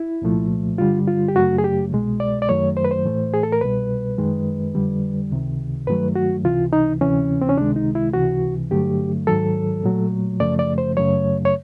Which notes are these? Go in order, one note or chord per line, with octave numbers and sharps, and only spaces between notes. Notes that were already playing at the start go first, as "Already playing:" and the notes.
Already playing: E4
C2 A#2 F3 A3
G2 D3 G3 F4
F4
G4
F#2 C#3 F#3 A3 F#4
G#4
G4
C2 B2 G#3
D5
D5
F#2 D#3 F#3 A3 C#5
C5
B4
C5
A2 E3 A3
G#4
A4
A#4
C2 B2 G3 B4
F#2 D#3 G#3
F2 D3 G3
C#2 C3 D#3
G2 D#3 F#3 A3 B4
F#4
C#2 C3 E3 F4
D#4
D2 C3 E3 C#4
C4
C#4
C#2 C3 D#3 G#3 D4
D#4
E4
C#2 C3 E3 F#4
G2 D3 F#3 A3 G4
G#2 D#3 F#3 A4
A#2 F#3 A3
F#2 C#3 F3 A3 D5
D5
C5
F#2 C#3 F#3 A3 C#5
C#5